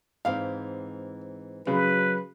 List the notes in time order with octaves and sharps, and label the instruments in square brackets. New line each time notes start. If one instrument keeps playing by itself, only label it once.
[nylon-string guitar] G#2 E3 C4 [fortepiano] F5
[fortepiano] C#3 [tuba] F#3 [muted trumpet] B4